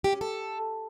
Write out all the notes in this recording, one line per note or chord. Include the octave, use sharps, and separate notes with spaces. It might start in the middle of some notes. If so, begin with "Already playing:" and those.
G4
C#4
A4